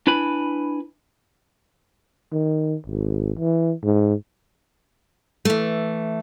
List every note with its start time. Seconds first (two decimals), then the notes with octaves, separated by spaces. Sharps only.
0.07 D4 E4 B4 G#5 B5
2.32 D#3
2.86 G#1
3.38 E3
3.83 G#2
5.45 E3 A3